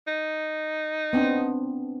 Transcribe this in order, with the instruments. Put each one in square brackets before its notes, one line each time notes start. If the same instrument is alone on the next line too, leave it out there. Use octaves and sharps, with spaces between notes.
[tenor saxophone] D#4
[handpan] B3 C4 D4